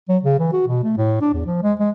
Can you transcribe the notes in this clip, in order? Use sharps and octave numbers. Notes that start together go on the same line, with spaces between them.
F#3
C#3
E3
F#4
B2
A3
A2
D4
E2
F3
G#3
G#3